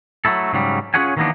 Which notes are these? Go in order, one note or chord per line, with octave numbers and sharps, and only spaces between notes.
F#3 A3 E4 A4
G#2 C#3 F#3 G3
C#4 F4 G#4 C#5 F#5 G#5
D#3 E3 F#3 A#3 B3 D4